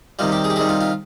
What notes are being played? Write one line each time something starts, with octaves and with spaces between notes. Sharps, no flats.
C3 D#3 G3 F4
G4
G#4
G4
C3 D#3 G3 G#4
F4
F4